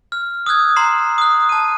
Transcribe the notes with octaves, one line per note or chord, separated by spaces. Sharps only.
F6
D#6 E6 F#6 G#6
A#5 C6 C7 E7
D#6 F#6
A5 D#7